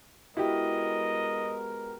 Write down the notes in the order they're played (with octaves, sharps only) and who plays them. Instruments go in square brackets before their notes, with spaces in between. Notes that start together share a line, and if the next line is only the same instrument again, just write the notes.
[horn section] G#3 B3 A#4 [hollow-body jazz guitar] E4 [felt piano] F#4 G4 [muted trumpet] D#5